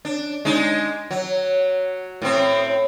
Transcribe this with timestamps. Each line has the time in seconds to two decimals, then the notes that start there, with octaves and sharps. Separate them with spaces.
0.05 D4
0.45 G#3 D4 D#4
1.11 F#3
2.22 A2 C4